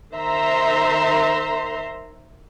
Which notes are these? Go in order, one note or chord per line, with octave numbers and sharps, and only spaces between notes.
D#3 C5 E5 A#5 C6